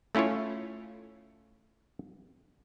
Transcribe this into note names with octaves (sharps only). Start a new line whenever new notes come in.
A3 C#4 E4 F4 C#5